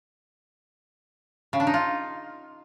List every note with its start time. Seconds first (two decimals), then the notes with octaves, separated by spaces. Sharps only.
1.53 C#3
1.60 D4
1.67 D#4
1.74 F4